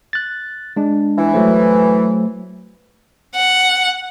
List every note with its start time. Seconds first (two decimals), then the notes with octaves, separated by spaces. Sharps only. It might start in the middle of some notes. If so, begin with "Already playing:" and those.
0.13 F#6 A6
0.76 G#3 D4
1.17 E3
1.33 F#3 A3 C5
3.35 F#5